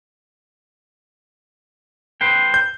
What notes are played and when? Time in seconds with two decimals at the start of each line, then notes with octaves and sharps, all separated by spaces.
2.21 B4 C5 G5
2.54 G6